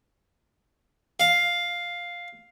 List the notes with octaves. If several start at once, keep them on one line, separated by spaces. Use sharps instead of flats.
F5